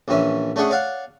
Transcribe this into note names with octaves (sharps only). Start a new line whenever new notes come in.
A#1 E3 C#4 E5
A3 C#4 D4 G#4 F#5
C#5 D5 F5 F#5